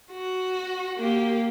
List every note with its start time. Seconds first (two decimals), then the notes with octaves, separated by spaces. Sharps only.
0.12 F#4
0.98 A#3 G4